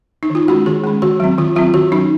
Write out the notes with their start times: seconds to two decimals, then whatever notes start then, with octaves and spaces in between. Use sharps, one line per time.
0.23 D#4
0.30 D#3
0.35 F4
0.48 G#3 C#4 F#4
0.66 D#3 G#4
0.84 G#3 C#4
1.02 D#3 F#4
1.20 F#3 C4
1.38 D#3 F4
1.56 F#3 C4 F4
1.74 D#3 F#4
1.92 F#3 C#4 D#4